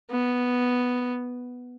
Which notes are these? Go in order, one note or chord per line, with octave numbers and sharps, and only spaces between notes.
B3